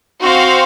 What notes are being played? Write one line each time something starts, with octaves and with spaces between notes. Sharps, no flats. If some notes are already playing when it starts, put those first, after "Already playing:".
C4 F#4 C5 F5